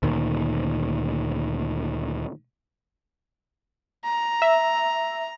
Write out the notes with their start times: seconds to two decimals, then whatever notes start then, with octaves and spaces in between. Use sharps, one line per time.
0.03 D2 A#2 D#3
4.04 A#5
4.42 E5